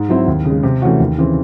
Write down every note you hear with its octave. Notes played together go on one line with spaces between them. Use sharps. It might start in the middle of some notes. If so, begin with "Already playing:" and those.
Already playing: G#2
F#3 C4 E4
D#2
C#3 G#3
C3
E3 A3 C#4 F#4
D#2
C#3 E3 C4